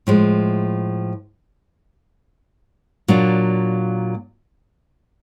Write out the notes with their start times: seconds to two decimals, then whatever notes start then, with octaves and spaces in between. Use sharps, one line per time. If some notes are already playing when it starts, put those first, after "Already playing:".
0.07 A2 F3 G#3
3.08 A#2 F#3 A#3 D4